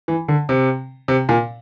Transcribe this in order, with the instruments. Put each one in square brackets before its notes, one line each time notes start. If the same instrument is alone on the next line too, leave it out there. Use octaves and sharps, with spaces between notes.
[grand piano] E3
D3
C3
C3
A#2